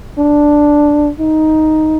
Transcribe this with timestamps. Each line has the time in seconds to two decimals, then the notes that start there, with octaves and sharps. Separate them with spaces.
0.19 D4
1.20 D#4